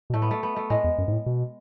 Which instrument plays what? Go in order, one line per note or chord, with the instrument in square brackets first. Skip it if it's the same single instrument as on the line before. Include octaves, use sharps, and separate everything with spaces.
[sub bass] B2
[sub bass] A2 [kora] A3
[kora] B3
A3
B3
A3
[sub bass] A2 [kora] G#3
[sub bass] E2
F#2
G#2
A2
B2